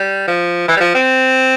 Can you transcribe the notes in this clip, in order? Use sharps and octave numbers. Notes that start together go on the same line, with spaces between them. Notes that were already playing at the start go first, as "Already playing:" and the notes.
Already playing: G3
F3
E3
G3
F3
C4